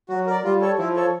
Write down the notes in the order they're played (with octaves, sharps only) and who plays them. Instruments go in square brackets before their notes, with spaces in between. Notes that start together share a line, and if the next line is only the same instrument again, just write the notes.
[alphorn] F#3 [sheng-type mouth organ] F#4
[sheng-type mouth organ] A#4 D5
[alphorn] G3 [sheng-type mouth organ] F4
[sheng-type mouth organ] A4 C#5
[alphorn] F3 [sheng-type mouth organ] E4
[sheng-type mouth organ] A4 C#5